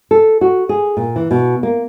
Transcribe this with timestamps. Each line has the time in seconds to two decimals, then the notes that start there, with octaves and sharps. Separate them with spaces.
0.11 A4
0.41 F#4
0.69 G#4
0.97 A#2
1.16 E3
1.31 B2
1.63 A#3